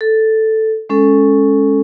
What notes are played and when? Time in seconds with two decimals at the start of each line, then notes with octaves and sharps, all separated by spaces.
0.01 A4
0.89 G#3 C#4 A4